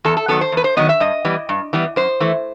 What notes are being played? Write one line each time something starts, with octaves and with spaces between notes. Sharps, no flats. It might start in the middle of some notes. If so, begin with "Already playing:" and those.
E2 A4
A4
D#3 F#3 B3 A4
C5
E2 B4
C5
D#3 F#3 B3 D#5
E5
G2 D#5
E3 G3 B3
G2
E3 G3 B3
F#2 C5
E3 A3